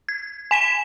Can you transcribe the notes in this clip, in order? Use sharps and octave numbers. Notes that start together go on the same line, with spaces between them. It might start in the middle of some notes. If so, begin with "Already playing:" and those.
G#6
G#5 B6 E7